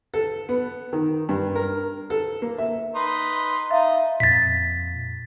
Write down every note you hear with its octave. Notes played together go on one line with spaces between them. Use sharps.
A4
B3
D#3
G2
A#4
A4
A#3
E5
D#4 B4 C6
D#4 E5 F5
F2 A#2 A6 B6